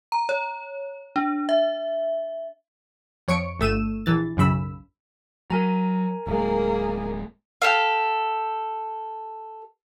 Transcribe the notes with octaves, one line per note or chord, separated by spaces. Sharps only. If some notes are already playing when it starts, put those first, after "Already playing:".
A#5
C#5
D4
E5
F2 C#5 C#6 C#7 D7
G1 A3 E6 D#7 E7
A#1 E3 A6
B1 F#2 C#3 B5 E6
F#3 A#4 G#5 A#5
D1 G#3 A#3 G#4
G4 A4 F5